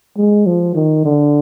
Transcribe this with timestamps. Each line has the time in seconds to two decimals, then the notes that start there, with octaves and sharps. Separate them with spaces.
0.17 G#3
0.46 F3
0.75 D#3
1.05 D3